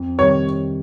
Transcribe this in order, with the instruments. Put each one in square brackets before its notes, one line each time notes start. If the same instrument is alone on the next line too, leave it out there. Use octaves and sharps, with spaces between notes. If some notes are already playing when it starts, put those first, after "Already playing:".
Already playing: [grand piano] F2
[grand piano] C3 D#3 G3 [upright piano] C#5